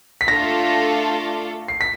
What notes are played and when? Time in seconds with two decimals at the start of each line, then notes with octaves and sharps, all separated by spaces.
0.21 B6
0.28 A3 D4 F4 A4 A#6
1.68 C7
1.81 B6